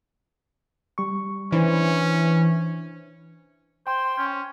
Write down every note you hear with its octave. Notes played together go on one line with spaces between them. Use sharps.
G3 C#6
E3 C#4 D4 C5
C5 G5 C6
C#4